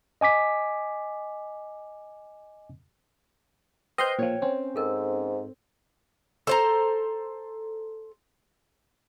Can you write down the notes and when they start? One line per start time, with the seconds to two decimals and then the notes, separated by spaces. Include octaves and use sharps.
0.21 D#5 G#5 D6 B6
3.98 B4 C5 D#5 G5 C6 G6
4.19 A#2 F3 C#5
4.42 C4 C#4
4.76 G#2 A4 A#4
6.47 A4 C5 A#5